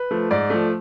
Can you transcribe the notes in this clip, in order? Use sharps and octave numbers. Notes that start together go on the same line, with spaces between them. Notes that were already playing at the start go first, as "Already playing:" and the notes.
Already playing: B4
F3 A3
G#2 D5
F3 A3